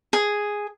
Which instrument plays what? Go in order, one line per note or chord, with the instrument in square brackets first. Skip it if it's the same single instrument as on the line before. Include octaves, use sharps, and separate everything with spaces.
[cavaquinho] G#4